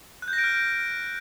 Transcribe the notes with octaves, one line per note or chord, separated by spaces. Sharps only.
F#6
G6
A#6
D7
F6